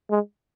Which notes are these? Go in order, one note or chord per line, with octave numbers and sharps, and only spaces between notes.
G#3